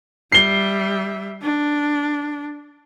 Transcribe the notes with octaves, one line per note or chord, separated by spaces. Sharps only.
G3 E5 C7 G7
D4